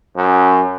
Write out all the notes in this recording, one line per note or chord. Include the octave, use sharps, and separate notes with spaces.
F#2